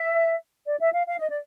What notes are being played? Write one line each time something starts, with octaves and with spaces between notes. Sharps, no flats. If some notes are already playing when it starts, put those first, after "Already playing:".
Already playing: E5
D5
E5
F5
F5
D#5
D5